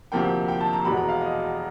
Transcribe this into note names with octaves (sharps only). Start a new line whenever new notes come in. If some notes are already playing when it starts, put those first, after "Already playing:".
D2 C3 F3 A#3 G5
G5
A5
A#5
E2 B2 G#3 B5
A#5
F5
D#5